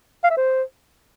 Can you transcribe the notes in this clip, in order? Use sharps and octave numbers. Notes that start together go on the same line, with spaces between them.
F5
E5
C5